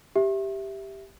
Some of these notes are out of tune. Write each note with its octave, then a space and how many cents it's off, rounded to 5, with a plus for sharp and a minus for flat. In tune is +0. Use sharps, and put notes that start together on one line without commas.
G4 +0 E5 +0